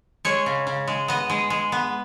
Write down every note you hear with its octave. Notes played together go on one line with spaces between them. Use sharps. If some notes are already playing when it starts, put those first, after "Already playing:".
G#3 C#5
C#3
C#3
G#3
B3 D#5
G#3
G#3
B3